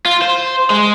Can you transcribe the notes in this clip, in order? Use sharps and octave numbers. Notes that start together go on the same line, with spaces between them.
F4
C5
G#3